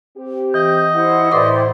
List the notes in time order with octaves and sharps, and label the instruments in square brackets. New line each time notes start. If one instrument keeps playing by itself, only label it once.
[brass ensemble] C4 G4
[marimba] E3 [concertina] D#5 [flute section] G6
[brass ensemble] E4 [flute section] C5 F#5
[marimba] A2 B4 D6 [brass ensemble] E4 C5 [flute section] G4 D5 C6